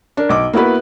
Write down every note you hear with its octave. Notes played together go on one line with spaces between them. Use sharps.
D4 A#4
B1 D6
A#3 B3 E4 F#4 B4